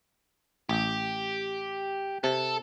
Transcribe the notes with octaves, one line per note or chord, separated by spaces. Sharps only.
A1 G4
C3 A4